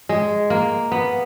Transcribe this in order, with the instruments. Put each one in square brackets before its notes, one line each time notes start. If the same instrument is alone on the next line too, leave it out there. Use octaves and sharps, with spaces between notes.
[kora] G#3
A#3
B3